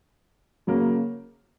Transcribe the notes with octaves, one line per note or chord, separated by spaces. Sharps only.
C#3 F#3 A#3